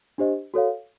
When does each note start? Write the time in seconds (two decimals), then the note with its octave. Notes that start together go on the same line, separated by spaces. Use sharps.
0.18 D4 G4 C5 D#5
0.54 F#4 A4 C#5 F5